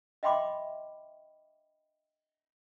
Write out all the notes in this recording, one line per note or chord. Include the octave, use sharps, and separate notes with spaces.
D#5 E5 G5 B5 C6 D6